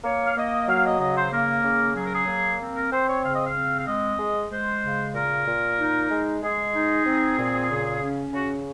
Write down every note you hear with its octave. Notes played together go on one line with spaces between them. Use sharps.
A#3 C#5
F5
A#3 D#5
F#3 F5
D#5
C#3 D#5
C5
A#3 A#4
C#3
F#3 G#4
A#4
G#4
A#3
C4
A#4
C4 C5
C#5
C#3 F5
D#5
F5
C4
F5
G#3 D#5
G#3
G#3 C5
C#3
A#2 A#4
A#2
D#4
G#3
G#3 G#4
D#4
C4
A#2
C#3
C#4
C#3 F#4